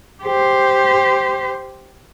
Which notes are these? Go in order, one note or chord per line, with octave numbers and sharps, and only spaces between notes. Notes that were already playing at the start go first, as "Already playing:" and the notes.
G4 C5